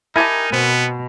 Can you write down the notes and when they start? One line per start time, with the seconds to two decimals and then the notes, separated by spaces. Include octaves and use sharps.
0.16 D#4 E4 G4 A#4 G#5 A5
0.52 B2 B3 C4